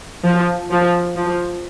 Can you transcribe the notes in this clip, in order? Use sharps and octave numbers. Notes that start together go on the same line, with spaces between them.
F3
F3
F3